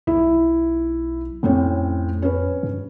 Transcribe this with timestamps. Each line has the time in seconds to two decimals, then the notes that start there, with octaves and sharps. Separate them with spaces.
0.07 B1 E4
1.43 F2 A2 C4 C#4
2.22 C#4 B4
2.63 G2